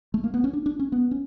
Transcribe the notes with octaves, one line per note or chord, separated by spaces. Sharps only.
A3
A#3
B3
C#4
D4
D4
C#4
B3
C#4